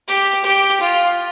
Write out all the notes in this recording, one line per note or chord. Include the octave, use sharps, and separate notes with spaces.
G4
G4
F4